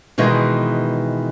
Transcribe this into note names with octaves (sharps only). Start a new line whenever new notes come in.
B2 D#3 E3 G#3